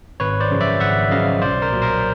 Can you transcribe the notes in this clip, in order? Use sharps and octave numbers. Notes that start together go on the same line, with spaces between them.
G#1 B4 C#5
C5 D5
F#2 C#3 F3
D5 E5
G#1 E5 F#5
F#2 C#3 F3 D#5 F5
B1 C5 D5
A#4 C5
A#2 F#3
A#4 C5